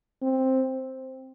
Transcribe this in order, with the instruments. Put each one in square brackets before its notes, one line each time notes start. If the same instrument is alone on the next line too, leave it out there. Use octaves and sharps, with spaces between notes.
[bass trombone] C4